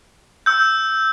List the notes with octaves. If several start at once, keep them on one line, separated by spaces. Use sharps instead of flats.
E6 G6